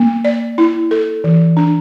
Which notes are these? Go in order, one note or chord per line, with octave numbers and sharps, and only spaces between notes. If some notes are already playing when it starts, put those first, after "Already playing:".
Already playing: A#3
D5
E4
A4
E3
D4